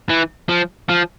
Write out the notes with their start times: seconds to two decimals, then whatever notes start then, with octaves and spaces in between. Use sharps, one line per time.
0.09 E3
0.49 F3
0.89 F3